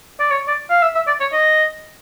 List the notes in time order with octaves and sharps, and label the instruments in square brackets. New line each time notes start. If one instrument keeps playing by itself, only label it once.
[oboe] D5
C#5
D5
F5
E5
E5
D5
C#5
D#5